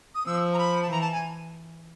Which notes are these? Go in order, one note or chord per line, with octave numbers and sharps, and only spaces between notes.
D#6
F3 E6
A#5
B5
A5
E3 A#5
A5
G#5